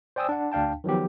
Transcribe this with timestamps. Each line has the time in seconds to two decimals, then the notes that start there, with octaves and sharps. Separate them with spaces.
0.16 C5 D5 G5 G#5 D#6 E6
0.29 D4 F#5
0.52 D2 D4 F5 G5 A5
0.84 D#3 F3 F#3 B3 G4